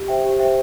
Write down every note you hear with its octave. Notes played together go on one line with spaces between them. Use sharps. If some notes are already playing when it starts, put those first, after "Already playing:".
Already playing: G4
C5 E5 G5
G4
C5 E5 G5